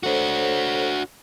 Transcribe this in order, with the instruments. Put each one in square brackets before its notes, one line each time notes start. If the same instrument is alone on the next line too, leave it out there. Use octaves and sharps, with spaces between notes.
[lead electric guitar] D4 F#4 [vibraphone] A4 C5 C#5